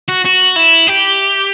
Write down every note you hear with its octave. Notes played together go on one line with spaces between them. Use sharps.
F#4
F#4
E4
G4